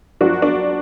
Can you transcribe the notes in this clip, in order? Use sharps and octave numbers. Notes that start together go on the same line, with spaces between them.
F#2 F3 D4 F#4
D4